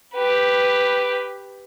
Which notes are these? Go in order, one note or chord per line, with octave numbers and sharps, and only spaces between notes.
G4 B4